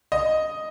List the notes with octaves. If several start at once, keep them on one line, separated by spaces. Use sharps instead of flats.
D#5